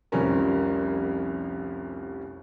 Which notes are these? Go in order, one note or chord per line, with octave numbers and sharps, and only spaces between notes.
F1 C2 F3 G3 C#4 A#4